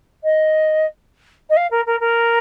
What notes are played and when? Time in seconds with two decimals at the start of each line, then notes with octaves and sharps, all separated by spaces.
0.24 D#5
1.50 D#5
1.57 F5
1.71 A#4
1.86 A#4
2.00 A#4